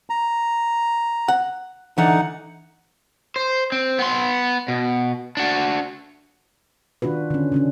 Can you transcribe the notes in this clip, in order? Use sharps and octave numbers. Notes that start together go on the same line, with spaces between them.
A#5
F#5
D3 E3 D#4 F#5
C5
C4
B3 C6
B2
D4 F#4
D#3 D4 F4 F#4 B4
D3 C#4
C#3 C#4 D4